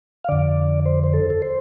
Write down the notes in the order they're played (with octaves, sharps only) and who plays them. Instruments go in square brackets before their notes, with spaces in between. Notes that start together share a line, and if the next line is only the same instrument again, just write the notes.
[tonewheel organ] F5
F2 D3 D5
C5
C5
A4
A4
C5